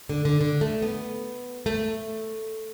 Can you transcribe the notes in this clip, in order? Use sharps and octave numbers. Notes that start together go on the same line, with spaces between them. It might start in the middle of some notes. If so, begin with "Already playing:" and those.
D3
D3
D3
A3
B3
A3